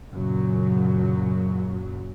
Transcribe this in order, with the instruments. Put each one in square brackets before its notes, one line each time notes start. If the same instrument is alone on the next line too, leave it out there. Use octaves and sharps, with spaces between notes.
[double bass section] F#2 A#2 C#3 F#3